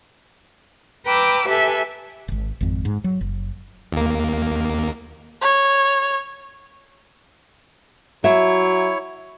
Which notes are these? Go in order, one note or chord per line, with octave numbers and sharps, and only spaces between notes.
B4 G5 A#5 D6 E6
G4 A4 B4 E5 G#5
D1 G#1
G#1 F2
G#2
F#3
F#1
D#2 A#3
C#5
F#3 E4 C#5 E5